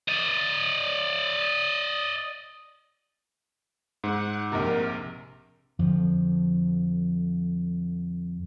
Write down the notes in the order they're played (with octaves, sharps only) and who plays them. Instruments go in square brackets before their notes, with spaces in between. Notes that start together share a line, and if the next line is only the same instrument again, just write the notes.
[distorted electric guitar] D5 D#5
[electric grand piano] G#2 [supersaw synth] F#5
[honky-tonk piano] A#1 C3 [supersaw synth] A#4
[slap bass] F2 D3 F3